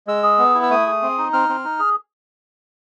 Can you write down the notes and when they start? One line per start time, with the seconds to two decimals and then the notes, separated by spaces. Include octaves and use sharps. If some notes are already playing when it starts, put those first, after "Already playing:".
0.07 G#3 E6
0.23 G#4
0.38 B3
0.55 E4
0.63 E6
0.70 A3 D#6
0.86 G#4
1.02 C4
1.18 D#4
1.33 C4 F6
1.49 C4
1.64 D#4
1.79 G#4